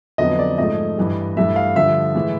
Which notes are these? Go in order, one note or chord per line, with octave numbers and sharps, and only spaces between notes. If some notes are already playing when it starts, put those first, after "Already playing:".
F2 D3 F#3 B3 D#5
D5
G#2 F3 A3 D#5
G2 E3 G3
G2 E3 A3 E5
F5
G2 D3 F3 E5
A2 E3 G#3